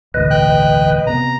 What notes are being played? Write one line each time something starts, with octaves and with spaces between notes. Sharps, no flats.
E1 A1 D2 B4 D#5
G5 F#6
C3 B3 A#5